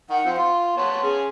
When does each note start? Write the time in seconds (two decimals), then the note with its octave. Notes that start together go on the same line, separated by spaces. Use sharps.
0.10 D#3 F#5
0.26 F3 C4
0.37 F4 C6
0.77 B3 C#5 A5
1.03 C#4 G#4